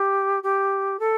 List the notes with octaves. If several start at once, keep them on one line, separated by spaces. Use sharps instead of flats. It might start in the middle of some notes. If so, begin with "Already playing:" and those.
Already playing: G4
G4
A4